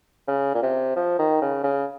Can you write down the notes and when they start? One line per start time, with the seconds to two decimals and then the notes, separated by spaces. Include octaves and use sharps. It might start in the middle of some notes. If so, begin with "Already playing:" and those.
0.28 C#3
0.54 A#2
0.63 C3
0.96 F3
1.19 D#3
1.42 C#3
1.64 C#3